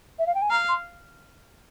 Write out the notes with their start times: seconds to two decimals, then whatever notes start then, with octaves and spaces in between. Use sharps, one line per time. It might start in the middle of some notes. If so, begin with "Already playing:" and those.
0.19 E5
0.26 F5
0.34 G5
0.41 G#5
0.50 F5 A#5
0.68 C6